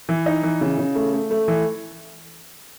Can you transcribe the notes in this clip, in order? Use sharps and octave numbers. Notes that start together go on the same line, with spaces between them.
E3
D#4
E3
C#3
C#3
A3
A3
A3
E3